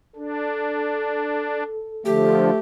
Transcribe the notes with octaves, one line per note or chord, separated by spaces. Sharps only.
D4 A4
D3 F3 A3 G4